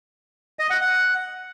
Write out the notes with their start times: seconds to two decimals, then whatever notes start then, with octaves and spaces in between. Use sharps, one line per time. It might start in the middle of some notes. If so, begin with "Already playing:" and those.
0.59 D#5
0.70 F#5
0.81 F#5